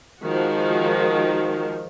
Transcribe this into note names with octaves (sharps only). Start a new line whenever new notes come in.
D#3 F3 G#3 F#4